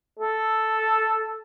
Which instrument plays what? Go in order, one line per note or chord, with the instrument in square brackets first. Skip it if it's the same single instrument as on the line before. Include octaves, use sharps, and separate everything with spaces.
[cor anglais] A4